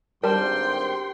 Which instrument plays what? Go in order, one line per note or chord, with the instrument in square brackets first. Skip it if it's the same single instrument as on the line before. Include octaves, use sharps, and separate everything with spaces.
[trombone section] G#1 G2 C5 [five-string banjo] G3 A5 [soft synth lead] A#4 [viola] G5 C6